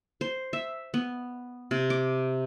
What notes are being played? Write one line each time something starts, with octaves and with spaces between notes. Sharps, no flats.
C5
E5
B3
C3
D6